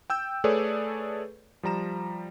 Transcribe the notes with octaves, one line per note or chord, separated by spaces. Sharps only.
G5 E6 G6
A3 G#4 A4 B4 C#5 D5
F3 G3 A#5 E7